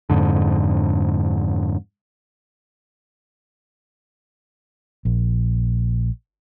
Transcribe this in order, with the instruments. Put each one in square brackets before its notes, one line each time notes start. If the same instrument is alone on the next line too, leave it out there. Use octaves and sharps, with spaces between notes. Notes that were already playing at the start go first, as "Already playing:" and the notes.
[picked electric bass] F2 G#2 D3
[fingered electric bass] A#1